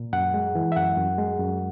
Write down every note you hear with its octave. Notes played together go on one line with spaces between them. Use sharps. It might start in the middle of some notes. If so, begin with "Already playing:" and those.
Already playing: A#2
F#2 F#5
G#3
E3
E5
F#2 F#5
F#2
G#3
F#2